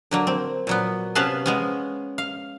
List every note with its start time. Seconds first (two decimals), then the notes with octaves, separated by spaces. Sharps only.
0.11 D3 F#3 A#3
0.27 C4
0.67 A#2 F#3 B3
1.15 C3 B3 C#4 B4 F5 A5
1.46 G#3 B3 C#4
2.18 F5